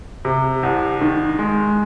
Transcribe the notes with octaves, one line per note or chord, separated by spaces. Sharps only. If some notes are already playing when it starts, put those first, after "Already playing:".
C3
C2
D#3
G#3